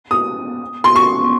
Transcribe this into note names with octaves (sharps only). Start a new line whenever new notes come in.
D#6
C6
C#6